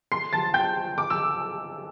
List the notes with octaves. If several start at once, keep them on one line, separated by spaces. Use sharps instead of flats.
C6 C7
A5 A6
G5 G6
D6
E6